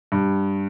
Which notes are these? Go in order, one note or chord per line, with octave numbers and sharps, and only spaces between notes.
G2